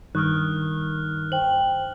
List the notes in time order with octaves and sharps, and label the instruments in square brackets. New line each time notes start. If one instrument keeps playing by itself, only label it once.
[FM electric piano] G2 [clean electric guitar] D#3 [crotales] F6 F#6
[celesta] C5 G5 [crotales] F#7